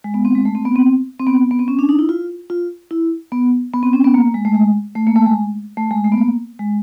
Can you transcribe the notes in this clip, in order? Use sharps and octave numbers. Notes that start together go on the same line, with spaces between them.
G#3
B3
C4
G#3
A3
C4
B3
C4
C4
B3
B3
C4
C#4
D4
D#4
E4
F4
F4
E4
B3
B3
C4
C#4
B3
A#3
G#3
A3
G#3
A3
A#3
A3
G#3
A3
G#3
A3
B3
A#3
G#3